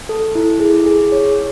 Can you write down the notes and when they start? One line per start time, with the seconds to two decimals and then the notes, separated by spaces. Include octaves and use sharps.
0.09 A4
0.35 E4
0.60 G#4
0.86 G#4
1.12 C#5